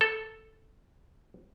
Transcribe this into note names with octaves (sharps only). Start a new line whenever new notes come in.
A4